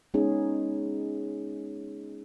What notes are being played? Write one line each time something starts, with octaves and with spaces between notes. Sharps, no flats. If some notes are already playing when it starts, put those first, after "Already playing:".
G#3 B3 C#4 D#4 G#4